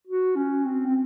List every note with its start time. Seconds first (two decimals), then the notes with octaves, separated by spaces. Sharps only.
0.07 F#4
0.36 C#4
0.65 C4
0.87 C4